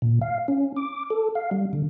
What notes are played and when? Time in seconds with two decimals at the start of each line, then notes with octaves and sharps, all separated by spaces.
0.02 A#2
0.21 F5
0.48 C#4
0.77 D6
1.10 A4
1.35 F5
1.51 G3
1.73 D3